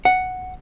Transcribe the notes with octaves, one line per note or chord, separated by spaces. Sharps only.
F#5